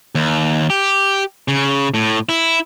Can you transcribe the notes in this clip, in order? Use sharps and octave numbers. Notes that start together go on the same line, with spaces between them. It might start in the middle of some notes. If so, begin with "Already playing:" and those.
D#2
G4
C#3
A2
E4